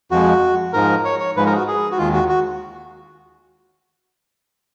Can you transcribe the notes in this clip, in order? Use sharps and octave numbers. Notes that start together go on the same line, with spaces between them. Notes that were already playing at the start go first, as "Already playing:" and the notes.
F2 F3 G#3 F#4
G#2 F3 G#3 A#4
C#5
C#5
G#2 F3 G#3 B4
A#4
G#4
F#4
G#4
F#4
D#2 D#3 G#3 F4
F#4
F#4